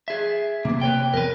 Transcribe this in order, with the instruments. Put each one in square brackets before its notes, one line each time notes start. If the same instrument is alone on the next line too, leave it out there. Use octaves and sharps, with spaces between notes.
[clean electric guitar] G#4 E5
[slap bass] C3 B3 [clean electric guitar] A#3
[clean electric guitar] B4 C#5 G5
[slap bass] E2 [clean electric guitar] A#4 B4